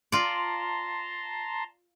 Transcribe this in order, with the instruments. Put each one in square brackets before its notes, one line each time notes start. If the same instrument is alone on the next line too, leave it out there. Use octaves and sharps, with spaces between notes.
[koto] F4 D5 [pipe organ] A5 A#5 C6